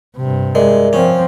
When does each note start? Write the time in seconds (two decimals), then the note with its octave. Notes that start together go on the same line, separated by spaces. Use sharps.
0.17 G2 C3
0.55 G#3 A#4 D5 E5
0.93 F3 C4 C#4